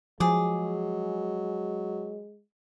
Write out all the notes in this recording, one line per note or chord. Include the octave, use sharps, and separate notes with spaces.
F3 F#3 G#3 G#4 D6